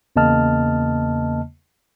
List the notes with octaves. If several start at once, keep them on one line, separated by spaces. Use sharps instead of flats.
E2 C#3 A#3 D#5 A5 F6